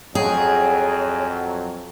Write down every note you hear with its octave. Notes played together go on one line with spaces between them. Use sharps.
F2 F#3 G#4 C#5 D#5 G5 G#5